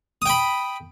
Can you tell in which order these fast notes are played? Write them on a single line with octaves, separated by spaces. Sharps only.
D#6 G5 B5